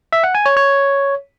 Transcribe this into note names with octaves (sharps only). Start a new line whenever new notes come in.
E5
F#5
G#5
C#5
C#5